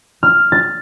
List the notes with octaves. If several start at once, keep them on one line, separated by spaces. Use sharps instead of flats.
F6
A6